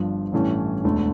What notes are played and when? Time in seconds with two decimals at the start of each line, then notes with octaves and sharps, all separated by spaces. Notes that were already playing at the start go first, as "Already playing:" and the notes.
Already playing: G1 G2 F3
0.32 A1 G2 E3 A3 C#4
0.84 E1 D2 D3 A3